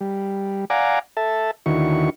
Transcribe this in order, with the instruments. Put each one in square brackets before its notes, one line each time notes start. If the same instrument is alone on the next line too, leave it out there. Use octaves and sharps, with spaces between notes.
[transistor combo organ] G3
D5 F5 F#5 G#5 A#5 D6
A4 E5 A5
D#2 D3 D#3 E4 F#4 C#6